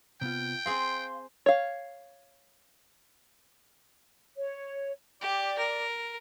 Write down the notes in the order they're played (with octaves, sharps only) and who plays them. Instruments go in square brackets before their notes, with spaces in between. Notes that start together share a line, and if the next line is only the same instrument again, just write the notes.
[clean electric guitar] C3 B3 F4 [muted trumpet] G5
[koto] C4 G#4 C5 [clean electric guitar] F5 [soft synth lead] C6
[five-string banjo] C#5 F5
[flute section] C#5
[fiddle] G4 [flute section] D5 D6
[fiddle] A#4